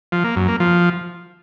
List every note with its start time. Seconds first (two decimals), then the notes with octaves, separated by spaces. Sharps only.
0.12 F3
0.24 A#3
0.36 F#2
0.48 A#3
0.60 F3